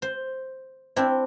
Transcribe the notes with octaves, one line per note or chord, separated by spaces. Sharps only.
C5
C4 D4 E4